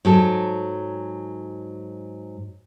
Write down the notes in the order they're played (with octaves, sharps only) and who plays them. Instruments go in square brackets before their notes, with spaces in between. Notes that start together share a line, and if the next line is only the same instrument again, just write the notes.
[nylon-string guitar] G#2 F#3 A4